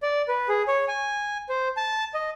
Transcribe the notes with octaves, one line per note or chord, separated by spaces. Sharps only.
D5
B4
G#4
C#5
G#5
C5
A5
D#5